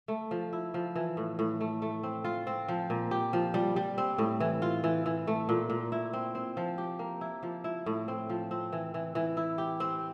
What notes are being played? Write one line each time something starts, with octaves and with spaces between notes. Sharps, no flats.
A3
F3
E4
F3
E3
A2
A2
A3
A3
C4
F4
C4
F3
A#2
G4
F3
G3
G3
C4
A2
E3
F4
E3
E3
A3
A#2
A#2
E4
C4
C4
F3
G4
A#3
E4
F3
E4
A2
C4
F3
C4
E3
E3
E3
E4
G4
C4